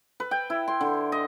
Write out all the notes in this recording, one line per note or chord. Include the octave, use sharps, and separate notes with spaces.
B4
G5
E4
C6
D3
D#5